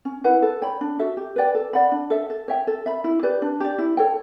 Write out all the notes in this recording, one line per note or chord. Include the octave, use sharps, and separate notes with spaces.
C#4
E4 B4 F#5
A4
C#5 G5 B5
D4
F#4 A4 E5
G4
B4 D5 G5
A4
D5 F#5 B5
D4
A4 E5
A4
C#5 E5 G5
A4
E5 B5
E4
G4 B4 D5
D4
G4 D5
E4
A4 C#5 G5